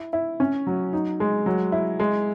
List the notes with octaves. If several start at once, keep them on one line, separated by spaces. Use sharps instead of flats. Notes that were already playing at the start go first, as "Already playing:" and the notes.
Already playing: E4
E4
C#4
F#3
D#4
G#3
F#3
E4
G#3